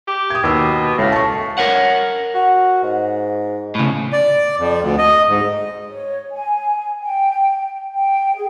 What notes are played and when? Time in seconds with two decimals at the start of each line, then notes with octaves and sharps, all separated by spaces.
0.08 G4
0.30 D#6 G#6
0.44 D#2 B2 E6
0.98 C#2 A2 F5
1.12 A5 C#6
1.58 A#4 C#5 F#5
2.35 F#4
2.83 G#2
3.75 A2 C#3
4.13 D5
4.59 F2
4.82 D2
4.98 D#5
5.28 G#2
5.89 C#5
6.33 G#5
7.00 G5
7.92 G5
8.35 G#4